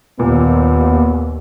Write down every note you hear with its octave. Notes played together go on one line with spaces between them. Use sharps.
D#2 A#2 B3